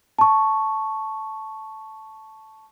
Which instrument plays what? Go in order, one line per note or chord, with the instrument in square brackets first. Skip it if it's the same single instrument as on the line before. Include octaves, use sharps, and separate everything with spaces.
[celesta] A5 C#6